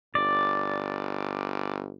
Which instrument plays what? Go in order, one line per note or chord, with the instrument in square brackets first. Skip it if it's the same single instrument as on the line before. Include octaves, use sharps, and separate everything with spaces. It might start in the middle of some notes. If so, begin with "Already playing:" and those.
[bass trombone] G1 [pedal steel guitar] D5